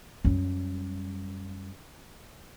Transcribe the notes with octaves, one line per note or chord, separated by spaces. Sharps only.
F#2 G3